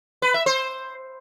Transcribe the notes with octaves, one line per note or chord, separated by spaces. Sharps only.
B4
E5
C5